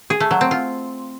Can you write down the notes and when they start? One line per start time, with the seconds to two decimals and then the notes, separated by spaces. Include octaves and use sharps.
0.10 G#4
0.20 A3
0.31 F#3
0.41 C4
0.51 F4